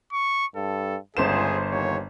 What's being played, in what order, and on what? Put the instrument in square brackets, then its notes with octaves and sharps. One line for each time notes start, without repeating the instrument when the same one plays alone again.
[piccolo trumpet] C#6
[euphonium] G2 [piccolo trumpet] A4
[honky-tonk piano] G1 C5 E7 [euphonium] C#2 [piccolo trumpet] G#4
[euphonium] D#2 [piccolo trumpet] C#5